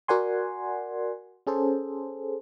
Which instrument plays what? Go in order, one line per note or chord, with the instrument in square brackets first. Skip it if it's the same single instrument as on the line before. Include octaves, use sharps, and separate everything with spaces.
[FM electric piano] F#4 A#4 D5 F#5 G#5 C6
C#4 G#4 A4 C5